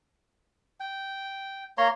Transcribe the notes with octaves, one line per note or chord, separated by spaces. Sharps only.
G5
A#3 C#5 A#5 C6